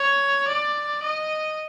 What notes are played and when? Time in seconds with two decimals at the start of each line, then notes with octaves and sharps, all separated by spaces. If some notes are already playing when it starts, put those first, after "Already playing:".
Already playing: C#5
0.48 D5
1.03 D#5